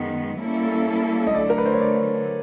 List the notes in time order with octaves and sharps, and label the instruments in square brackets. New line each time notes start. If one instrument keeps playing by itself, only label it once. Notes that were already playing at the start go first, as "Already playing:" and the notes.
Already playing: [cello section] F#2 D#3 G#3 B3
G3 A#3 C#4 E4 A4
[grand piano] D#5
[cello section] D3 F#3 A3 [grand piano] D5
[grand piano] A#4
B4
C5
C#5
D5